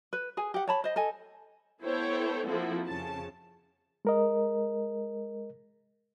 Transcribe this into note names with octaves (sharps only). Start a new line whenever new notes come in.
B4
G#4 G#5
G4 F#5
C#5 A5 B5
C5 D#5
A4 D#5 G#5
B3 E4 A4 C5 C#5 G5
F3 A#3 C4 E4 F#4 A4
F2 C#3 A5
G#3 A#4 D#5